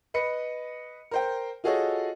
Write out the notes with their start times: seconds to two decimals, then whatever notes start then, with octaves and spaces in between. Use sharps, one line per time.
0.14 B4 D#5 B5 C#7
1.11 A#4 C5 G5
1.64 F4 F#4 G#4 A4 C#5 D#5